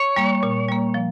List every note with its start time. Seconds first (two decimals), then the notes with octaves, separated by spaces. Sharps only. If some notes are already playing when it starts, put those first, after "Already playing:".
Already playing: C#5
0.16 G3 A#3
0.43 A#2
0.68 G3 A#3
0.94 F3